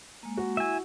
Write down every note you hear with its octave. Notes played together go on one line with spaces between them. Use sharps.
G#3 A#3
F#4
E4 E5 G#5